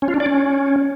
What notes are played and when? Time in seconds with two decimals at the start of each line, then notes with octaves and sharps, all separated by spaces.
0.02 C#4
0.08 F4
0.14 D4
0.20 D5
0.26 C#4